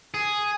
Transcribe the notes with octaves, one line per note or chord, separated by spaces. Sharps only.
G#4